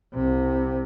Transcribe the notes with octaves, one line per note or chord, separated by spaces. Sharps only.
C2 C3